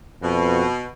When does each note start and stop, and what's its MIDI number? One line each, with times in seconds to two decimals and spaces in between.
0.23 0.66 41
0.23 0.89 47